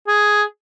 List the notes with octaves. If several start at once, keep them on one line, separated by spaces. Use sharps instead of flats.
G#4